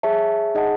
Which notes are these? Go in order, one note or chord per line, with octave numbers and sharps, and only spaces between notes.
G#4 C#5 E5 A5
D#4 G#4 D#5 F#5 A5